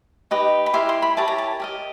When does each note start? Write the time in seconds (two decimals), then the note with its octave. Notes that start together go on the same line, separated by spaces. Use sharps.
0.31 D#4 G4 B4 D#5
0.66 B5
0.73 E4 G4 A#4 C6
0.89 C6
1.02 B5
1.17 E4 G4 A#4 C#5 A5
1.28 A#5
1.38 A5
1.60 G4 A#4 D#5